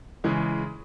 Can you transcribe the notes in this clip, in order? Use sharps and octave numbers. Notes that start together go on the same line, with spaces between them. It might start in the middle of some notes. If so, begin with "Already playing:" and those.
C#3 E3 G#3